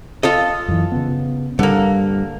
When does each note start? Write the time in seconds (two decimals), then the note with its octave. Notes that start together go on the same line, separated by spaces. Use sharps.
0.23 F4 A4 D#5
0.68 F#2 E3
0.92 C#3 B3
1.59 G2 D3 G3 A#3